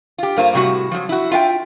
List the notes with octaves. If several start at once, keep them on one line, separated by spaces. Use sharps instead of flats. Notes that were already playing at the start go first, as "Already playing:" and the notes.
F4 G4
G2 A#3 F4 C5
A2 C3 G3 F#4
F3 F#3
E4 F#4
F4 E5 F5 G5